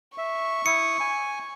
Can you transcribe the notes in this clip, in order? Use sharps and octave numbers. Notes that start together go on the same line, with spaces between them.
E5 C#6
E4 D#6 C#7
G#5